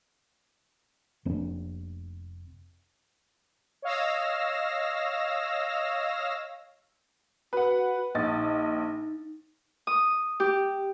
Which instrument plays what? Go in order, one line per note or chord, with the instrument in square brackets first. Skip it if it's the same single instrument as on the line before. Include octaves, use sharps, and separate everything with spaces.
[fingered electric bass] F1 A#3 C4 D4
[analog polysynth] C#5 D#5 F5 E6 A#6
[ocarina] F#4 [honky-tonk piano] B4 F#5
[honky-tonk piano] A#1 D#5 A6 [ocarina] D#4
[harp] D#6
G4